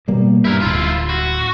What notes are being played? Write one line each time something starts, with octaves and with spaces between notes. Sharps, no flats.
B2 G3 A#3
G2 E4 A#4
D1 E4 F4
F#4